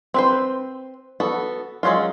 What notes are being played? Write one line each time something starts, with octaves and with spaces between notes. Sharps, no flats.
C4 B4 C5
B3 F#4 A4
F#3 G#3 C#4 F4